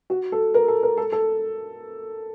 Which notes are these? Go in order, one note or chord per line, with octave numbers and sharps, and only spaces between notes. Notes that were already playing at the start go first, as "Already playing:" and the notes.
F#4
A4
A#4
A4
A#4
A4
A4